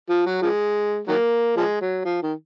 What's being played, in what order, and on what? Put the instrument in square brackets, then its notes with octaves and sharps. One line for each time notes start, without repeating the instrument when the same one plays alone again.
[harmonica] F3
F#3
F3 G#3
D#3 F#3 A#3
F3 G#3
F#3
F3
D#3